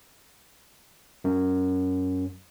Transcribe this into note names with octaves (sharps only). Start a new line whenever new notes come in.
F#2